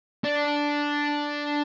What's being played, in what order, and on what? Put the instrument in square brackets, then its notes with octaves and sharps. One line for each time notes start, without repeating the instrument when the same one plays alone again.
[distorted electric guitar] D4